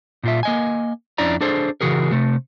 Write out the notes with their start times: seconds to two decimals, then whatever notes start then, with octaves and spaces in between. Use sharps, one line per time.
0.23 A#2 F4 E5
0.43 A#3 D#5 G#5
1.18 F2 C#4 D4 E4 D5 A#5
1.41 D4 G#4 A4 C5
1.81 C#3 E3 F#4 G#4 A#4
2.11 C3 A3